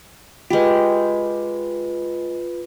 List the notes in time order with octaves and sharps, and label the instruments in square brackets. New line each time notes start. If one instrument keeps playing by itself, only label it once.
[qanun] G#3 G4 [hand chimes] F4 B4